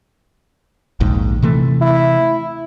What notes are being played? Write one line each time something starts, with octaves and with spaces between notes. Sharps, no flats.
A#1 D#2 G#2
C3 E3 A3
E4